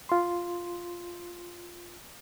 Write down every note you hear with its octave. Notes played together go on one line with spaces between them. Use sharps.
F4 C6